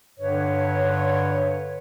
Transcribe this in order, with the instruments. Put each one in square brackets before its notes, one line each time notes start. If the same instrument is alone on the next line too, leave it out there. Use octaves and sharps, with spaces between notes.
[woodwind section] G2 D3 B4 C#5